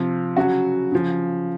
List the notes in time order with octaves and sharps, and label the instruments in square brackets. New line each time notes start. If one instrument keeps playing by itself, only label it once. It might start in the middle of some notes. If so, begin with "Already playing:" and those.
Already playing: [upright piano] C3 F3
C#3 F#3 F#4
C#3 F3